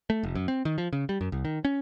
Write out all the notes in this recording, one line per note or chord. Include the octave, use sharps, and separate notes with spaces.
A3
F1
F#2
C4
D#3
F3
C#3
G3
F#2
C2
D#3
C#4